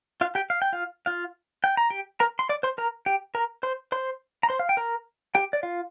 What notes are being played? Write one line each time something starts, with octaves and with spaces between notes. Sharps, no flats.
F4 F5
G4 G5
F5
G5
F4 F5
F4 F5
G5
A#5
G4 G5
A#4 A#5
C6
D5 D6
C5 C6
A#4 A#5
G4 G5
A#4 A#5
C5 C6
C5 C6
A#5
C5 C6
F5
G5
A#4 A#5
G4 G5
D5
F4 F5